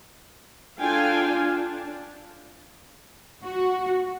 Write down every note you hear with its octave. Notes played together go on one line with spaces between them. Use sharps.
D4 F4 A4 F5 G5 G#5
D4
F#4